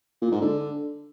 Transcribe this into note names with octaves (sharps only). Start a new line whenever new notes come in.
A#2
G#2
D3